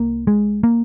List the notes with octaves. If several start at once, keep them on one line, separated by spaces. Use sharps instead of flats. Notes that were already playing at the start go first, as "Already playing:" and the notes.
Already playing: C2 A#3
G#3
A#3